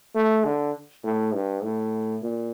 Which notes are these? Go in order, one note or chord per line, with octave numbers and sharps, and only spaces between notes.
A3
D3
A2
G2
A2
A#2